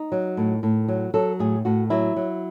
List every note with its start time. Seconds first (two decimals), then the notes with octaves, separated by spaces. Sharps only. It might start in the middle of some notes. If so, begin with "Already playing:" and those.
Already playing: D#4
0.12 F#3
0.37 A2
0.63 A2
0.88 F#3
1.14 F#3 A4
1.39 A2 G#4
1.65 A2 F#4
1.90 F#3 E4
2.16 F#3